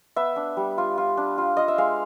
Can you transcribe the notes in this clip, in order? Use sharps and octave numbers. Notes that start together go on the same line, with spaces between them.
B3 E5
D4
G3
F4
F4
D4
F4
F4 D#5
E5
G#3 F5